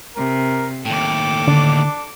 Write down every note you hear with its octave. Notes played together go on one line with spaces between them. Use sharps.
C3 A#4
D#2 A2 A4 G5 D6
D3 D4